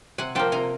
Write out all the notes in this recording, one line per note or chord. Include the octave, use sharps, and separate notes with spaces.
C3 F#5 G#5
F3 A#3 G5 A5
C3 G#5 A#5